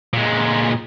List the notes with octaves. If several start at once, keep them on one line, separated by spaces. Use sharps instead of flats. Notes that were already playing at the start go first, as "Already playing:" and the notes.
A#2 G#3